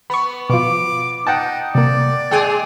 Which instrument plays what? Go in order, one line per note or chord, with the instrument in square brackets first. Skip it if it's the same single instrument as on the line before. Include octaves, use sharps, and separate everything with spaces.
[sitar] B3 [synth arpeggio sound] B5 C#6
[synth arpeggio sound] B2 F3 [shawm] D6
[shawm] D#4 [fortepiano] F#5 G5 A5
[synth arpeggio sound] C3 A#3 [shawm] D5
[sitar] G#3 G#4 [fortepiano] G5 G#5